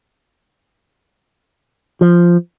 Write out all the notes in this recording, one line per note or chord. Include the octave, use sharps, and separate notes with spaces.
F3